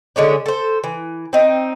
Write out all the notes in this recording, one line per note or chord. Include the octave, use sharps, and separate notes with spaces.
D3 G#3 C#4 D4
A4 C5
E3
C4 D#4